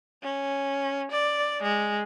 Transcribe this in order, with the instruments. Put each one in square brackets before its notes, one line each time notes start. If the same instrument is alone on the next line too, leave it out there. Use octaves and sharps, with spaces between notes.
[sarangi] C#4
D5
G#3